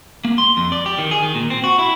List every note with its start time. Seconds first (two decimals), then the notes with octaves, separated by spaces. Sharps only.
0.25 A#3
0.38 C6
0.57 F2
0.72 D5
0.86 G4
0.98 D#3
1.11 G#4
1.23 D#3
1.35 A#2
1.50 C4
1.64 F#4
1.79 E4